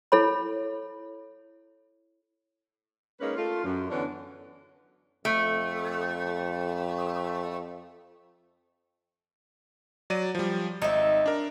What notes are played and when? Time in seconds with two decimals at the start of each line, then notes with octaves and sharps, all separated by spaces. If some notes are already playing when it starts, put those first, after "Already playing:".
0.12 E4 A4 C#5 B5
3.20 G#3 A#3 C#4 D#4 B4
3.37 A3 F4
3.64 F#2
3.90 D3 E3 B3 C#4 D4
5.25 F2 A3
10.10 F#3 D5 D#7
10.35 F3 G3
10.82 G#1 D#4 E5
11.26 D4 A#4